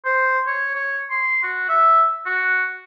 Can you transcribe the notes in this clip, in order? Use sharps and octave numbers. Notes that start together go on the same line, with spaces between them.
C5
C#5
C#5
C6
F#4
E5
F#4